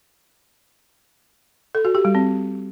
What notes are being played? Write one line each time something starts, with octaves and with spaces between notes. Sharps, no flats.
A4
F#4
G4
G3
C4